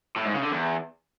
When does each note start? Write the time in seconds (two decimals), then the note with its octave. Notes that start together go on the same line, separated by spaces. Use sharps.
0.16 A2
0.25 G#2
0.34 C#3
0.43 D3
0.52 E2